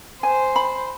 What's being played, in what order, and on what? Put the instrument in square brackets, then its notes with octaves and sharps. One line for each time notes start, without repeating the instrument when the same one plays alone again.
[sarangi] C5 [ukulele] G#5
[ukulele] B5